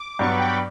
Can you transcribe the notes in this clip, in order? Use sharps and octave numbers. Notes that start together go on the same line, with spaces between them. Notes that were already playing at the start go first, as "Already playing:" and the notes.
Already playing: D6
G2 F#3 B3 C#6
B5
G5
B5